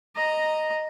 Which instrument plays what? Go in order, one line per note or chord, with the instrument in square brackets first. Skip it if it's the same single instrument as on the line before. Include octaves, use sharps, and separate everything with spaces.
[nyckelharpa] D#5 A#5